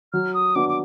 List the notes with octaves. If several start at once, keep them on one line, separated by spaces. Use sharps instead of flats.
F#3 F6
D#6
B3 D4 F#4 D6
D6